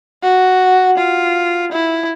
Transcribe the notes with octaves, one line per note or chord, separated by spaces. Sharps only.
F#4
F4
E4